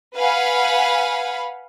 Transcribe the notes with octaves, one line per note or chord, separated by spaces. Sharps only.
B4 F5 F#5 G#5 B5